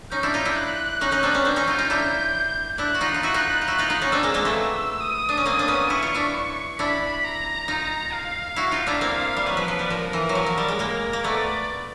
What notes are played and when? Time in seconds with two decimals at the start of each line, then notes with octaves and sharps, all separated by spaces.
0.12 C#4 D#4 G6
0.23 D4 E4
0.34 D#4 F4
0.45 D4 E4
0.56 F#6
1.01 C#4 D#4
1.12 C#4 D#4
1.23 C4 D4
1.34 B3 C#4
1.45 C4 D4 G6
1.56 C#4 D#4
1.67 D#4 F4
1.78 D#4 F4
1.90 D4 E4
2.78 D4 E4 F#6
2.95 F#4
3.01 D#4 F4
3.14 F4
3.23 E4 F#4 F#6
3.34 D#4 F4
3.62 F4
3.67 E4 F#4 F#6
3.79 D#4 F4
3.90 D#4 F4
4.02 C#4 D#4
4.12 C4 D4 E6
4.23 G#3 A#3
4.34 G#3 A#3
4.45 A3 B3
4.56 E6
5.01 D#6
5.29 D4
5.37 C#4
5.46 A#3 C4
5.59 D4
5.68 B3 C#4
5.90 E4 C#6
6.03 F4
6.15 D4 E4
6.79 D4 E4 B5
7.24 A#5
7.68 D#4 F4
8.13 F5
8.56 E4 F#4
8.71 D#4 F4
8.87 D4 E4
9.01 A#3 C4 F5
9.37 G3
9.46 F#3 B4
9.57 F3
9.68 F3
9.79 G3
9.90 F3 A#4
10.13 E3
10.29 F#3
10.35 F3
10.46 F#3
10.58 G3
10.68 G#3
10.79 G#3 A#3 A#4
11.13 A#3
11.24 A3 B3 D5